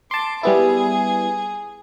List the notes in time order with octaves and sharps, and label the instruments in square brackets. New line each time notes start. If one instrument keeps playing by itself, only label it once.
[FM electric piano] A5 C6 [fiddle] D6
[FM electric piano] G3 B3 E4 [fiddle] G#4